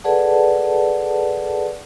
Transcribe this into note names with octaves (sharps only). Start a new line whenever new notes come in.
G#4 A4 B4 D5 F#5 A5